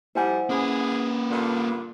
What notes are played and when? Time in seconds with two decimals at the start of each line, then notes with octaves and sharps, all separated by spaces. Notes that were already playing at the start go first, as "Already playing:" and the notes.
0.15 F2 G3 E4 C5 F#5 G#5
0.49 A#3 C#4 G#4 B4
1.29 G2 A#2 D3